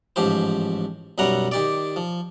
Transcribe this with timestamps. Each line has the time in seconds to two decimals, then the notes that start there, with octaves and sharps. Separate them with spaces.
0.16 A1 G#2 F3 G4 C5
1.18 B1 F#2 G3 F#5 A#5
1.52 D#3 G4 D5
1.96 F3